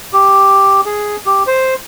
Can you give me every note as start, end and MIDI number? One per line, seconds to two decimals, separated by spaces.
0.13 0.81 67
0.86 1.16 68
1.26 1.43 67
1.47 1.74 72